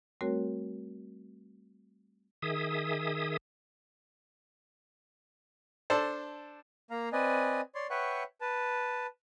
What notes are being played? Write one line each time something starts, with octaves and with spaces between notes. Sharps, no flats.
G3 A3 C4 F#4 A#4 C#5
D#3 G#4 E5 D#6
D4 A4 C5
A#3 F5 A#5
C4 B4 D5 D#5 G#5
C#5 D5 C6
B4 C#5 E5 F#5 G5 C#6
B4 A5